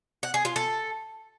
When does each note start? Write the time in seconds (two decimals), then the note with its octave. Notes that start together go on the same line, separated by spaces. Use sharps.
0.23 F#5
0.34 G#4
0.45 F4
0.56 A4